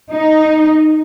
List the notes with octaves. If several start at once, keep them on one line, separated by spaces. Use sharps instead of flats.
D#4